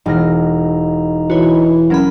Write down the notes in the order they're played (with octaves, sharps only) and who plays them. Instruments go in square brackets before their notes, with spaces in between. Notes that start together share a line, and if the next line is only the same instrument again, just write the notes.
[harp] E1 F6 A#6 [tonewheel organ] D#4
[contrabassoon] E3 [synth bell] F#4 C#5 [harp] B4
[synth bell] F#3 C#4 B5 [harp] A#4